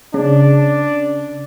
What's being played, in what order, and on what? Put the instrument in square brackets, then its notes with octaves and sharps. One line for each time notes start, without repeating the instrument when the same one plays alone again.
[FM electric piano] C#3 [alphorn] D4